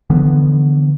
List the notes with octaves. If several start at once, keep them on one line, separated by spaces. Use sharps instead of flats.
D3 E3 F3 B3